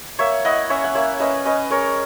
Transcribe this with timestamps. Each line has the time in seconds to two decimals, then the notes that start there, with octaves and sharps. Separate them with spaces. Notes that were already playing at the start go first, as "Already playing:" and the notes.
0.19 A#3 C#5 E5
0.45 E4 D#5 F#5
0.70 C#4 C#5 E5
0.84 F#5
0.95 A#3 C#5 E5
1.20 C#4 B4 D#5
1.45 C#4 B4 D#5
1.70 G#3 A#4 C#5